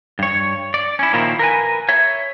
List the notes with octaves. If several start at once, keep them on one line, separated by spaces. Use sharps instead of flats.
G2 C#5
D5
C#4 E4
A#2 D#3 F3 A#3 E4
A#4 B4 G#5
C#5 E5